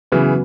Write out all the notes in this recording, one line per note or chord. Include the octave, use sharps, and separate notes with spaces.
C#3 E3 F#3 B3 F#4 B4